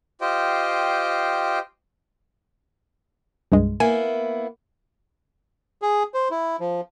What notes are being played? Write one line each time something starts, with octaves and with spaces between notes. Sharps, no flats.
F4 G4 C5 D#5 G5
C2 G2 G#3
A#3 B3 E4 G#5
G#4
C5
E4
F3